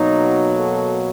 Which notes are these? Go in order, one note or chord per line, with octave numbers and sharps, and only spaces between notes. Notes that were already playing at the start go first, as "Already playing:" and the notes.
Already playing: B2 F#3 A#3 D#4
A4